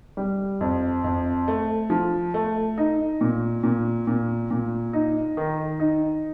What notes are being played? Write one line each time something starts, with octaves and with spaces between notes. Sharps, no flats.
G3
F2
F2
A3
F3
A3
D#4
A#2
A#2
A#2
A#2
D#4
D#3
D#4